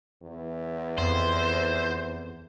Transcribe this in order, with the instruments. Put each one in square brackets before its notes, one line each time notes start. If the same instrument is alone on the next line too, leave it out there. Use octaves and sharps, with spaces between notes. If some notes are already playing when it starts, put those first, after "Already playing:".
[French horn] E2
[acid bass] F2 [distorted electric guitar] C5